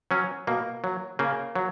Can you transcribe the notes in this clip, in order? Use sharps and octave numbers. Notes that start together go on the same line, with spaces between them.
F#3 C#4
B2 A#3
F#3
C#3 A#3
F#3